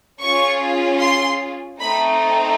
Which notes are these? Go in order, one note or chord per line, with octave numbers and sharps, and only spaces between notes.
C#4 F4 G#4 C#6
C6
A3 C4 D#4 B5